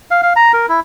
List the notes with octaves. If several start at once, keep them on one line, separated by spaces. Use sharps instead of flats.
F5
F5
A#5
A#4
E4